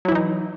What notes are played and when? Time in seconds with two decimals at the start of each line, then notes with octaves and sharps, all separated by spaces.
0.05 F#3
0.08 E4
0.12 E3
0.15 D#4